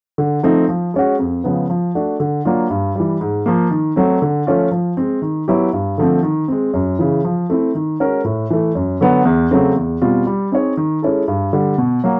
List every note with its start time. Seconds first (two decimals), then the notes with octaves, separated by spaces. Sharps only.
0.18 D3
0.43 F3 A3 C4 D#4
0.69 F3
0.94 G#3 C#4 F#4
1.19 F2
1.44 C#3 F3 G#3 B3
1.70 F3
1.95 A3 D4 F#4
2.20 D3
2.45 F#3 A#3 D4 F4
2.70 G2
2.96 E3 G3
3.21 G#2
3.46 F3 A#3
3.71 D#3
3.96 F#3 A3 C4
4.22 D3
4.47 F3 A3 C#4 F4
4.72 F3
4.97 G#3 C4
5.22 D#3
5.48 F#3 B3 E4 G4
5.73 G2
5.98 D3 F3 A3 C4
6.23 D#3
6.48 G#3 C4
6.74 F#2
6.99 C#3 E3
7.24 F3
7.50 A3 C4 E4
7.75 D#3
8.00 G#3 C#4 F#4 A#4
8.24 A2
8.50 E3 A3
8.75 F#2
9.01 D3 F#3 B3
9.25 E2
9.51 C#3 F#3 A3 C4
9.76 E2
10.02 B2 G3 C4 F4
10.27 G3
10.52 C4 D#4 G#4 C#5
10.77 D#3
11.03 G#3 C#4 E4 A4
11.28 G2
11.53 D3 G3
11.78 B2
12.04 F#3 A#3